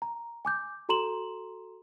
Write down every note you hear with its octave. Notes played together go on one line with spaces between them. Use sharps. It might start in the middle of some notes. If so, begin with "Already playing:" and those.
A#5
G#5 D6 G6
F#4 A4 A#5 C6 E7 F#7